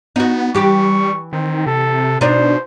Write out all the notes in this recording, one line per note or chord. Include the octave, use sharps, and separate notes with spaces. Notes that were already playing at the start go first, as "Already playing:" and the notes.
B3 D#4 F#4
E3 G3 G4 C#6
D#3 C4
C3 A4
B2 D4 D#4 C5